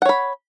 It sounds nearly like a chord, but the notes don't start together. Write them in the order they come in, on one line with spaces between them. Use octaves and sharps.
F#5 C#5 B5